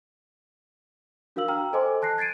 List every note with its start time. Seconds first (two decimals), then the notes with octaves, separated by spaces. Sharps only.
1.36 D4 F#4 A#4 F5 E6 F#7
1.48 G5 A#5 E6 F6
1.73 A4 C5 D#5 G#5 C6 D6
2.02 A5 F#6 A#6 C7
2.18 G#6 A6 C7 D7 D#7